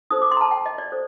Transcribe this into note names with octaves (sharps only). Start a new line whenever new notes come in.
D#4 A4 C5 D#6
D6
C6
A#5
A5
G5
D#5
D5
A4 C5